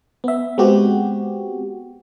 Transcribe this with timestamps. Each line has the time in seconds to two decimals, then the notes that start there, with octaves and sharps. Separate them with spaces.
0.24 B3 E5
0.58 G#3 B3 C4 F#4 G4